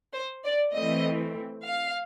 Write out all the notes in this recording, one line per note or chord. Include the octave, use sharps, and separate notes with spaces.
C5
D5
E3 A3 C4 D#5
F5